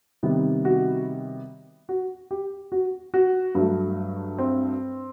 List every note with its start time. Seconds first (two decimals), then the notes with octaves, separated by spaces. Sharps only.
0.23 C3 D#3 G3 B3
0.65 F#4
1.89 F#4
2.31 G4
2.72 F#4
3.14 F#4
3.55 G2 F#3 A3
4.38 C4